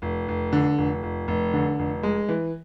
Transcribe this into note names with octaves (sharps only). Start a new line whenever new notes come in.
F1
F1
D3
F1
F1
F1
D3
F1
G#3
E3